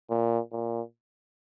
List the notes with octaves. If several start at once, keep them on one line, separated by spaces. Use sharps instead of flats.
A#2
A#2